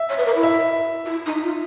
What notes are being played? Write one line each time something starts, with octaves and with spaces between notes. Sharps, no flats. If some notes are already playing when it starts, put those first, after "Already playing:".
Already playing: E5
C#5
B4
A#4
E4
E5
F4
E4
D#4
F4